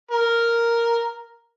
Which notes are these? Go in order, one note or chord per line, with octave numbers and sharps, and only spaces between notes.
A#4